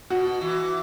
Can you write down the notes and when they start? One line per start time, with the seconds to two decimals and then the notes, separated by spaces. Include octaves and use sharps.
0.10 B2 F#4
0.41 E3